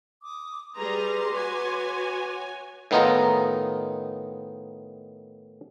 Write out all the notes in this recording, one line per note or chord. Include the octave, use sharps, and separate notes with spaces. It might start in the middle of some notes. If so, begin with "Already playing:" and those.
D6 D#6
G3 G#4 B4 A#5 C6 D6
F#4 C#5 G#5
A2 D#3 B3 D#4 F4 A#5